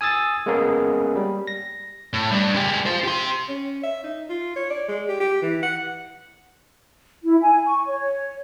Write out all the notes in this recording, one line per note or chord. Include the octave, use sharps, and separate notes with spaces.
G#5 D#6 E6 A6
G#3 A#3 B3 C#4 G#4 A#4
G3
A#6
A2
G2
G#3 G4
F4 C5
G4 C6
C#4
E5
D#4
F4
C#5
D5
G#3
G4
G4
E3
F#5
E4
G#5
C#6
C#5